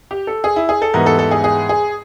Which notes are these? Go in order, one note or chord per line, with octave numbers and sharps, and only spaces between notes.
G4
A4
G#4
E4
G#4
A4
G#2 E3 G3 B3 A#4
A4
A4
G#4
G#4
G#4